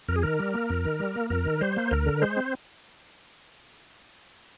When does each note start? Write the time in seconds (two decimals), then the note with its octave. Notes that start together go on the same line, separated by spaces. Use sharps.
0.08 F2 A#4
0.16 G#4
0.23 D#3 A#4
0.39 G3
0.54 A#3
0.70 F2
0.85 D#3
1.00 G3
1.16 A#3
1.30 F2 A#4
1.45 D#3
1.61 G3 C5
1.76 A#3
1.91 D2 A#4
2.06 D3
2.22 G#3 C5
2.37 C4